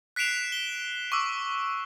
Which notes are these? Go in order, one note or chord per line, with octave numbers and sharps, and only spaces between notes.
F#6 B6 C7 D7 E7 F7
G7
C#6 D6 E6